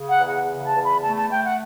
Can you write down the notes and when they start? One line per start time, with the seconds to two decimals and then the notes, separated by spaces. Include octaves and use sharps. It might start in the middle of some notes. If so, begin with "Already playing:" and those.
Already playing: C#3
0.08 F#5
0.18 E2
0.27 F#5
0.46 C#3
0.65 A5
0.74 E2
0.84 B5
1.02 A3 A5
1.17 A5
1.30 A3 G5
1.45 F#5